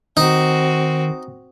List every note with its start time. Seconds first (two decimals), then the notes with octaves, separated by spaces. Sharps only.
0.17 D#3 C4 D#4 F#4